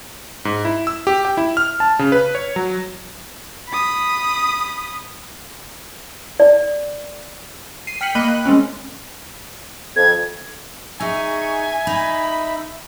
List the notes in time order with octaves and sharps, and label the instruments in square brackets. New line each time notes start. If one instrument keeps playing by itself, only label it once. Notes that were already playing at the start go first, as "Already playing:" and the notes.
[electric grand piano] G#2
E4
E6
G4
G5
E4
F6
A5
C#3
B4
C#5
F#3
[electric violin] B5 D#6
[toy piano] D5
[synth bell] C7 D#7
G5 F6 B6 C#7 F#7
A#3 D#5 B5 F#6 D#7
F#6
G#3 C4 C#4
[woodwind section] F2 [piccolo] G#6
[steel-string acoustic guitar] D#4 G#4 [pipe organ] E5 [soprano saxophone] G#5 [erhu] C#6
[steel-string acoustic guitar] D#4 [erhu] B5